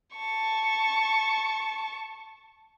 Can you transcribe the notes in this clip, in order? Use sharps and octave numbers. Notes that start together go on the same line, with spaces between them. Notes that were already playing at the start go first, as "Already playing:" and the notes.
A5 C#6